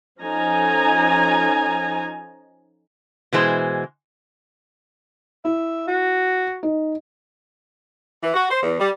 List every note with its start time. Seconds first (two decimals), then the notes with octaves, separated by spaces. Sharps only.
0.21 F3 C#4 D#4 A4 G#5 A#5
3.33 B2 E3 G#3 C5
5.45 E4 E5
5.87 F#4
6.63 D#4
8.22 E3
8.34 F#4
8.50 C5
8.63 E2
8.80 G3